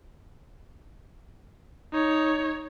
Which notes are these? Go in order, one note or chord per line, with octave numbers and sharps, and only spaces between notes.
D#4 C#5